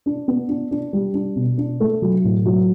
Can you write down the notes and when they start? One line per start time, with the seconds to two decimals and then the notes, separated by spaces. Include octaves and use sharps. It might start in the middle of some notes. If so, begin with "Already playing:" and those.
0.06 D4
0.28 B3
0.49 D4
0.71 D4
0.93 G3
1.14 D4
1.36 B2
1.58 D4
1.80 A3
2.02 F#3
2.24 A2
2.45 F#3